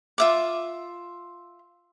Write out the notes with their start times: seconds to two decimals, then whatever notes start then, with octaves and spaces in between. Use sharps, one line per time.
0.18 F4 E5 D6